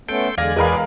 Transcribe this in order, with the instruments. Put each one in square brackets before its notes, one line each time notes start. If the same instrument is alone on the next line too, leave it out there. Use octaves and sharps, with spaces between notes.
[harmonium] A3 B3 C#4 [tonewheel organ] A4 G5 C6 [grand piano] D7
[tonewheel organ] E2 D5 G#5 [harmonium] D3 G#3 [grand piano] F5 A#6
[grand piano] E1 B5 [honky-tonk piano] G#3 A#4 F5 [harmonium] G#4 B4